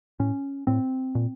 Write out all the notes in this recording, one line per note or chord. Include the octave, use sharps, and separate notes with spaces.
A2 C#4
A2 C4
A#2